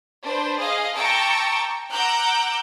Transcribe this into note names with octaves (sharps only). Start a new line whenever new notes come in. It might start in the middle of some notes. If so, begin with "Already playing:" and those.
D4 B4 C5
G#4 D#5 F5
G5 A5 A#5 C#6 D6 E6
F#5 A#5 D6 E6 F#6 G6